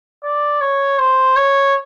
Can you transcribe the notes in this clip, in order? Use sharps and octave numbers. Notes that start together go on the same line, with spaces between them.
D5
C#5
C5
C#5